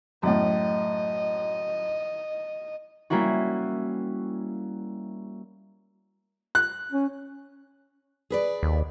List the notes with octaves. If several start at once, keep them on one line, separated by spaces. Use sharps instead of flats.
F#2 A2 D#5
G3 A#3 C#4 E4 F#4
F#6
C#4
G#4 B4 D5
D#2